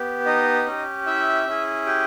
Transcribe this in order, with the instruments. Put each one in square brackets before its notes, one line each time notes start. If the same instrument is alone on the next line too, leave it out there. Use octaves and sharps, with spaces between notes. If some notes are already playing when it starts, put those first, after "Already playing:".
Already playing: [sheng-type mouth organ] B3 G4
D#4 D#5
C#4 G4
E4 E5
C#4 E4 G#4
G4 G5